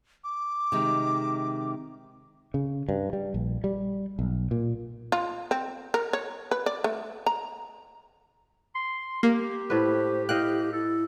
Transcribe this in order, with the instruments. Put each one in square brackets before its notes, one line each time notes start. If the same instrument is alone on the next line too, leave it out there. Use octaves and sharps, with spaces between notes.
[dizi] D6
[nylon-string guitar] C3 D#3 G#3
[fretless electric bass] C#3
G2
G3
A#1
G3
B1
A#2
[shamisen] F4
C4
A#4
C#5
B4
D5
A3
A#5
[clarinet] C6
[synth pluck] A#3 [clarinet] G4
[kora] A2 B4 [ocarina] C5
[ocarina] E4 [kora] D#5 F5 G5 [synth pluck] F#6
[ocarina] E4 [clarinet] A4